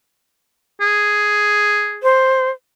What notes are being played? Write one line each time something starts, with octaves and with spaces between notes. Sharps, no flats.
G#4
C5